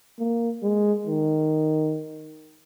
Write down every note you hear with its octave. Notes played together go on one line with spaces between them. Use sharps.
A#3
G#3
D#3